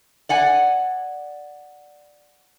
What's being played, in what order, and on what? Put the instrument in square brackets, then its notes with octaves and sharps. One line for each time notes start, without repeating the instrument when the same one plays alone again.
[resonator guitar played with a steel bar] D5 F#5 G#5